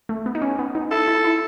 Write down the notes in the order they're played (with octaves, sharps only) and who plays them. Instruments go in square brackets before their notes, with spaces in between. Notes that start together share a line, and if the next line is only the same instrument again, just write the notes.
[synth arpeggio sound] A3
B3
D#4
C#4
B3
D#4
[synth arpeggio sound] E4 [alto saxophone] A4
[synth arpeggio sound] E4
E4